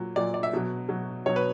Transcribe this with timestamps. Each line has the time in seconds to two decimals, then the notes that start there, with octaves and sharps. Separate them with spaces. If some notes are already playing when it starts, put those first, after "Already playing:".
Already playing: A#2 F#3
0.16 A#2 F#3 D5
0.34 D5
0.43 E5
0.53 B2 F#3
0.89 B2 F#3
1.26 B2 F#3 C#5
1.36 B4